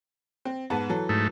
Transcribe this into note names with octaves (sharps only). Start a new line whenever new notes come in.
C4
G#2 B3 A5
E3 F#3 A4
G#2 A3